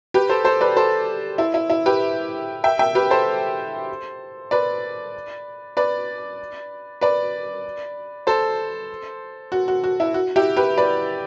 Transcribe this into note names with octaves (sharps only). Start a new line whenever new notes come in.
G4 B4
A4 C5
A4 C5
B4 D5
A4 C5
E4
E4
E4
G4 B4
E5 G5
E5 G5
G4 B4
A4 C5
B4 D5
B4 D5
B4 D5
A4 C5
F#4
F#4
F#4
E4
F#4
E4 G4
G4 B4
B4 D5